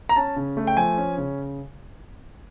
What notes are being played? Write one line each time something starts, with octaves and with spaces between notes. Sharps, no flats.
A#5
C#4 A5
C#3
A3
G5
F3 G#5
C#4
C#3